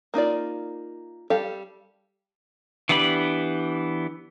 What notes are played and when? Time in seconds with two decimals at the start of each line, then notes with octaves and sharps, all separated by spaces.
0.14 A#3 D#4 F4 D5
1.30 G3 G4 A4 F5
2.89 E3 B3 D4 G4 B5